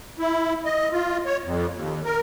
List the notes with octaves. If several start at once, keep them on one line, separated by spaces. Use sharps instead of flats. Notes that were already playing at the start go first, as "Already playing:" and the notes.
E4
D#5
F4
C#5
F2
D#2
A#4